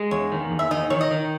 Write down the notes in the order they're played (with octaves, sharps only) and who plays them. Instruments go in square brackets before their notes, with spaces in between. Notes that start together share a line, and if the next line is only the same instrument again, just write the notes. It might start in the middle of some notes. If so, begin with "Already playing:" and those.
Already playing: [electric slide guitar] G#3
[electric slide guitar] E2 [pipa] C#5
[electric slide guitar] D#3
E2
[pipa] E5
[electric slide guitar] D#3 [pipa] D#5
[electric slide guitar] D#3 [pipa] C#5
[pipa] D#5
[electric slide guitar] D#3